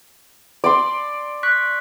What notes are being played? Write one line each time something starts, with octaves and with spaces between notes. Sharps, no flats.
D5 B5 C6
C#6 F#6 B6